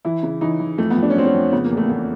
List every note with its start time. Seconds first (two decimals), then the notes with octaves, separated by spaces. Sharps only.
0.05 E3 E4
0.23 C#3
0.41 E3 D#4
0.60 E3
0.78 F2 A3
0.90 B3
0.97 F2
1.03 D4
1.10 C#4
1.16 F2 C4
1.25 C#4
1.34 F2
1.53 C#3 B3
1.64 A#3
1.71 E2
1.77 A3
1.89 E2 A3